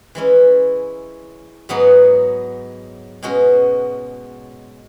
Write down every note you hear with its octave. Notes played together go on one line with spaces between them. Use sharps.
E3 G#3 C#4 E4
G#2 F#3 B3 D#4 G#4
B2 G#3 C#4 F#4